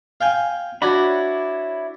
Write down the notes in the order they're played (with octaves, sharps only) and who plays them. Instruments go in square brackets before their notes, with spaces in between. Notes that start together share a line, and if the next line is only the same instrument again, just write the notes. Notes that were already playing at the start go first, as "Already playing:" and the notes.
[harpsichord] F5 G5 G#5
[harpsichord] D4 F#4 [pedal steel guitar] E4 C#5 B5